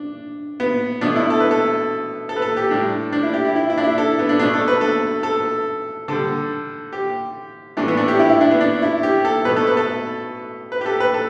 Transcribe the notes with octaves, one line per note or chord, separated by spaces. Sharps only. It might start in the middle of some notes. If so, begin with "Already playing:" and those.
Already playing: D4
B3
B2 A3 D4
E4
A4
B4
A4
A4
B4
A4
G4
A2 G3 D4
D4
E4
G4
E4
E4
E4
D4
E4
A4
B3
D4
B2 A3 D4
A4
B4
A4
A4
D3 G3 A4
G4
A2 E3 A3 D4
B3
D4
G4
E4
E4
D4
B3
D4
E4
G4
A4
B2 A3 B4
A4
B4
A4
B4
G4
A4
B4
A4